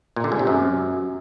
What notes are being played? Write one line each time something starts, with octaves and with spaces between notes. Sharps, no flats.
A#2
D3
G#2
C3
F#2